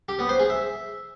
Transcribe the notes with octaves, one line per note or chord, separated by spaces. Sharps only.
G4
B3
C5
G#4
E5